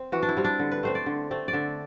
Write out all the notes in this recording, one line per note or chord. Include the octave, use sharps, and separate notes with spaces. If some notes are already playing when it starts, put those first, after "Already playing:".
Already playing: C4
E3 F#4
D4
E4
G3 C4
D4
D3
B4
A3 C4 C5
D5
D3
A3 C4
D5
D3 E5